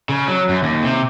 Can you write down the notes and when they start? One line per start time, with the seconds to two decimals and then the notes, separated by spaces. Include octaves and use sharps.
0.09 C#3
0.28 F#3
0.49 F#2
0.63 D#2
0.84 C3